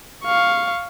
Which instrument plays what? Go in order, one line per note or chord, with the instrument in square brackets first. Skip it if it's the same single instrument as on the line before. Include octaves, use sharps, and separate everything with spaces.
[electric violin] F5 C#6